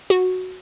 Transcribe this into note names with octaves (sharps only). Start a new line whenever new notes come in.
F#4